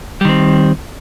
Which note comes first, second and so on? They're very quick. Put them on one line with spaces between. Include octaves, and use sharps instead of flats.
G3 D#3 C4